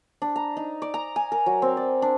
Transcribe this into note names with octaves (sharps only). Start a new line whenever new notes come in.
D4
A#5
D#4
D5
A#5
G#5
A#4
F#3
C4
D5
D4